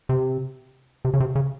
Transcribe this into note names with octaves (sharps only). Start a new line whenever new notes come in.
C3
C3
C#3
C3
C#3